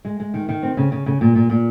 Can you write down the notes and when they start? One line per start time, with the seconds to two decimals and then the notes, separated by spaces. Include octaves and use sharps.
0.05 G#3
0.20 G#3
0.34 D#3
0.49 D#3
0.63 C4
0.77 C#3
0.92 C#3
1.06 C#3
1.21 A#2
1.35 A#2
1.50 A#2